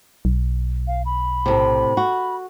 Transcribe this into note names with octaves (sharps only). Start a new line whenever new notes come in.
B1
F5
B5
A2 C3
F#4